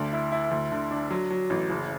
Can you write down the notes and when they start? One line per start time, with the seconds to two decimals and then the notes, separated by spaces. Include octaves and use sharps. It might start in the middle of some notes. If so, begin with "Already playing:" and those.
Already playing: D2 D4
0.13 E4
0.32 E4
0.51 D2
0.72 D3
0.91 D4
1.10 F#3
1.30 F#3
1.50 A1
1.70 F#1